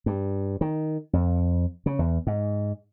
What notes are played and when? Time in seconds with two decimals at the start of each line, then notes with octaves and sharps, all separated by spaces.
0.06 G2
0.61 D#3
1.13 F2
1.86 C#3
1.99 E2
2.27 G#2